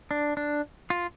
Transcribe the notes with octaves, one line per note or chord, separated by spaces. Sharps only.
D4
D4
F4